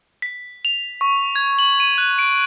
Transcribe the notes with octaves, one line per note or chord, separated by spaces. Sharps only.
B6
F7
C#6
G#6
F#7
D#7
F#6
D7